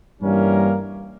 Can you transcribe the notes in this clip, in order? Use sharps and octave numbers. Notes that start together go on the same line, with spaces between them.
G2 E3 G3 A#3 C#4 A#4